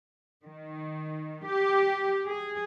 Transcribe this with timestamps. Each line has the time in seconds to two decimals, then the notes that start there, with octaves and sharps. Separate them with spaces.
0.44 D#3
1.47 G4
2.27 G#4